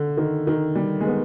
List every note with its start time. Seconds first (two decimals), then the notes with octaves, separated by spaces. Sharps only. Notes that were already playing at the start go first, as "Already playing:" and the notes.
Already playing: D3
0.17 D#3
0.47 D#3
0.75 G3
1.01 G#3
1.06 B3